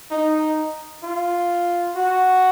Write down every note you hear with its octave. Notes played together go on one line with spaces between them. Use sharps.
D#4
F4
F#4